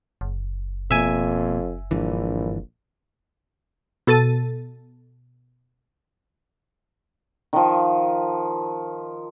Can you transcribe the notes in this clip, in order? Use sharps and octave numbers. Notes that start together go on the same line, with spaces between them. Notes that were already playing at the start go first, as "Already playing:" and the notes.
F#1
F2 B2 A#3 E5 G#5
A#1 G2 D3 E3
B2 A4 A6 D#7
D#3 F3